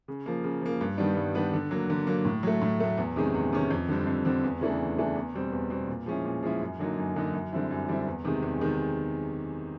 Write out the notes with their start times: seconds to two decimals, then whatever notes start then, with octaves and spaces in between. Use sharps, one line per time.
0.08 C#3
0.26 F3 A#3
0.44 C#3
0.62 F3 A#3
0.81 G2
0.98 D#3 G3 B3 D4
1.17 G2
1.35 D#3 G3 B3 D4
1.53 D3
1.71 F#3 A#3
1.90 D3
2.07 F#3 A#3
2.25 A2
2.43 F#3 A3
2.62 A2
2.80 F#3 A3
2.97 E2
3.16 C3 D#3 G#3 C#4
3.34 E2
3.53 C3 D#3 G#3 C#4
3.70 F2
3.88 D3 G3 C4
4.07 F2
4.25 D3 G3 C4
4.44 E2
4.61 C#3 E3 A3 D4
4.79 E2
4.98 C#3 E3 A3 D4
5.15 E2
5.34 B2 G3 C4
5.52 E2
5.70 B2 G3 C4
5.88 A#2
6.06 F3 G#3 C#4 E4
6.25 A#2
6.43 F3 G#3 C#4 E4
6.61 F#2
6.79 D3 F#3 A#3 D#4
6.98 F#2
7.16 D3 F#3 A#3 D#4
7.33 F#2
7.53 D3 G3 C4 E4
7.71 F#2
7.89 D3 G3 C4 E4
8.07 E2
8.25 C3 D#3 G#3
8.42 E2
8.61 C3 D#3 G#3